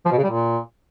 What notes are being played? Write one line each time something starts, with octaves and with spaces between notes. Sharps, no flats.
F3
B2
C#3
G3
A#2